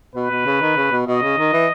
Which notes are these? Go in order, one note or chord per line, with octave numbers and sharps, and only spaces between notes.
B2 B4
B2
C#3
D#3
C#3
B2
B2 D#5
C#3
D#3
E3